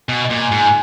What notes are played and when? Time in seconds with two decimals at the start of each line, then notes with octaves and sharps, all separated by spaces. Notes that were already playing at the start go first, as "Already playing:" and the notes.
0.08 B2 G#5
0.24 D#5
0.31 A#2
0.42 G#5
0.51 G#2
0.58 G#5